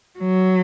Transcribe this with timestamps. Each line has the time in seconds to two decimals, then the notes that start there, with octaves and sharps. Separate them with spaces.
0.19 F#3